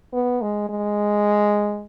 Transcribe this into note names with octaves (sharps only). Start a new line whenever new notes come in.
B3
G#3
G#3